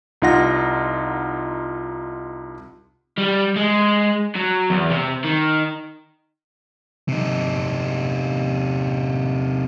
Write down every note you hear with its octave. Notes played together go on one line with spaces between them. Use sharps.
C2 D#4 F4 F#5 A#6
G3
G#3
F#3
E2
C3
D#3
C3 D#4